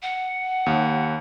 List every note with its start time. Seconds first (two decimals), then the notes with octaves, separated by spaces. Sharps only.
0.03 F#5
0.66 D#2